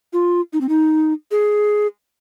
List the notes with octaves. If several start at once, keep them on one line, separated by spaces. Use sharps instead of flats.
F4
D#4
C4
D#4
G#4